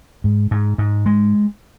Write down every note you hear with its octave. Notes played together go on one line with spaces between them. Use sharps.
G#2
G#2
G#2
G#3